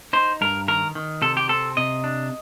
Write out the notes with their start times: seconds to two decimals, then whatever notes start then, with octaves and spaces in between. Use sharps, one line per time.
0.13 D#4 C5
0.41 G2 A#4
0.68 D#3 A#4
0.95 D#3
1.22 C3 A4
1.37 G4
1.49 C4 A4
1.77 C3 D#5
2.04 D4